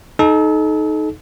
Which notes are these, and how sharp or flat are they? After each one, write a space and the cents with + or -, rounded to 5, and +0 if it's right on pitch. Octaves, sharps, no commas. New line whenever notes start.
D#4 +0 A4 -35